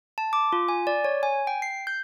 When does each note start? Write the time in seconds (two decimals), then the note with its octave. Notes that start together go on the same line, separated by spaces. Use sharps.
0.18 A5
0.33 D6
0.53 F4
0.69 G#5
0.87 D5
1.05 C#5
1.23 G#5
1.47 G5
1.62 C7
1.87 G6